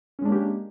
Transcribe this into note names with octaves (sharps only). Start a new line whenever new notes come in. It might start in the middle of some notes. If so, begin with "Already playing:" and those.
G#3 A#3 C#4 D4 G4